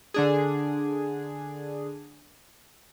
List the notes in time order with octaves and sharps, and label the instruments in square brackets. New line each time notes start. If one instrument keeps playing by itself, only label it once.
[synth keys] D3 D4 G#4